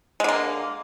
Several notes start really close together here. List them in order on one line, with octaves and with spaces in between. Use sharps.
G#3 D3 A#3